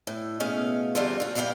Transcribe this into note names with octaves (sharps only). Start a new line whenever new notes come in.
A2
B2 A3 C#4 G#4 F5
E2 D3 G3 A3 C4 F4
F4 F#4
F2 E3 G3 E4 F5 G5